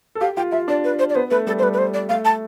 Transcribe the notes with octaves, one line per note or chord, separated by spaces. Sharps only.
A4
G4 F5
F4 G5
F4 E5
D4 D5
B4
C5
D5
B3 C5
A3 B4
G3 A4
C5
G3 B4
B4
C5
D5
A3 F5
A5